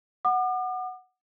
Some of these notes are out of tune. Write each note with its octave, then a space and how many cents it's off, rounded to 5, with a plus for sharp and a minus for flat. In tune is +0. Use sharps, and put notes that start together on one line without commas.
F#5 +0 D6 +45